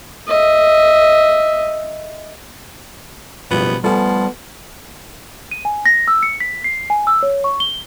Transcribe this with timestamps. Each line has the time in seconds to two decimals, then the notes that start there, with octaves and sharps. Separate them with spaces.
0.28 D#5 E5
3.51 F#1 B2 F3 G3 B3
3.84 F3 G3 A3 B3 A4 G#5
5.51 D#7
5.65 G#5
5.86 A#6
6.08 E6
6.23 C#7
6.40 B6
6.64 C7
6.90 G#5
7.07 E6
7.23 C#5
7.44 C#6
7.60 G7